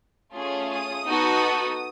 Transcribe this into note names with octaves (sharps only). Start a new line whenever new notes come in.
A3 C#4 F4 G#4
D#6
B3 D#4 F#4 A4